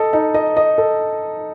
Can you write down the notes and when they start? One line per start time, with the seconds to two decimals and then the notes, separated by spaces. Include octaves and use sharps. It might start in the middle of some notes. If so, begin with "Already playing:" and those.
Already playing: A4 D#5
0.13 D#4
0.34 D#5
0.57 D#5
0.78 A4